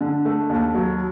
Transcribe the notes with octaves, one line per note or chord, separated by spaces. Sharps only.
D3
A3
D#2
F#3